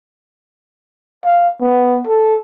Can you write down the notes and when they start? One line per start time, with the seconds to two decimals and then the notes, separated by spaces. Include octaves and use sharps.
1.24 F5
1.61 B3
2.07 A4